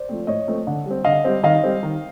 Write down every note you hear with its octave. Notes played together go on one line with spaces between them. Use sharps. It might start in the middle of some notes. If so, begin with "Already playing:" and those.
Already playing: C5 D5
F3 A3 C4
A2 C#5 D#5
F3 A3 C4
D3
G3 C4
D3 D#5 F5
G3 C4
D#3 D#5 F5
G3 C4
D#3